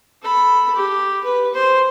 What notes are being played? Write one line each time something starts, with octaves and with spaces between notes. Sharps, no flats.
A4 B5
G4
B4
C5